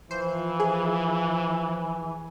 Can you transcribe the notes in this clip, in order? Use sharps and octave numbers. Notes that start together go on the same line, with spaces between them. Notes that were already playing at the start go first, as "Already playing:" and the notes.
E3 F3 C5
G#4 G#5